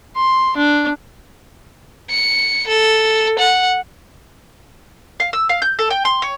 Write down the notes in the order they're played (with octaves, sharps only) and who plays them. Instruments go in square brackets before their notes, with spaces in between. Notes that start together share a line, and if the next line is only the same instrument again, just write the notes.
[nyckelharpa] C6
D4
[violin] C#7
A4
F#5
[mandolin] F5
E6
F5
G6
A4
G5
C6
C#5